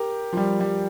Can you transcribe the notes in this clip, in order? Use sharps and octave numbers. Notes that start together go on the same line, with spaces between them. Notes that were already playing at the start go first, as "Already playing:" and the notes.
Already playing: G4 A#4
F3
G3
G3